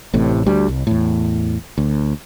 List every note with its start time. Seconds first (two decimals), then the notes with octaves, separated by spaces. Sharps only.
0.13 A1 A2 C3
0.46 D2 G3
0.68 C2
0.87 E2 A2
1.78 D2